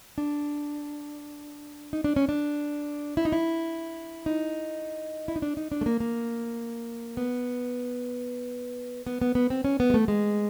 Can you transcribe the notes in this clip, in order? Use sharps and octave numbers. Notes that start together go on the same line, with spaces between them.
D4
D#4
D4
C#4
D4
E4
D#4
E4
D#4
E4
D#4
D4
D#4
D4
A3
A#3
A#3
B3
B3
B3
B3
C4
C#4
B3
G#3
A3
G#3